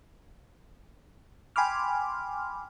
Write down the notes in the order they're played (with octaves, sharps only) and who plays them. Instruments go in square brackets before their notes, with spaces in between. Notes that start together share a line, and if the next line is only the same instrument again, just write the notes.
[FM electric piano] G5 G#5 B5 C6 D6 F6